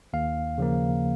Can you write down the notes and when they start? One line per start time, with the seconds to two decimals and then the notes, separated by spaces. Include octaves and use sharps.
0.13 D#2 F5
0.58 C#3 F3 A#3